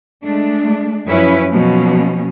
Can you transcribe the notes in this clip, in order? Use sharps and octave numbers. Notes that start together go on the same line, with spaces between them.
G#3 A3 D4
F#2 F3 C#4 E4 B4 C#5
B2 F3 F#3 A#3 C#4